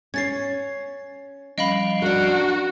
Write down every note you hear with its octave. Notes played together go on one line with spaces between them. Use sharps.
C#4 C#5 G#6 A6 C7
F3 G3 C#4 D#5 F5 B5
D4 F#4 A#4